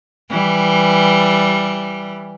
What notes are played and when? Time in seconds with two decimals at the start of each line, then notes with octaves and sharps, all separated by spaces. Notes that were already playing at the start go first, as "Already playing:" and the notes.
0.30 E3 G3